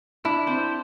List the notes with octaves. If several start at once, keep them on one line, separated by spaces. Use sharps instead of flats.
D4 E4
C4 C5